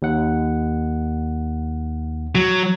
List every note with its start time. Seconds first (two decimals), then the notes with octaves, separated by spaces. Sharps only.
0.02 D#2 F#5
2.35 F#3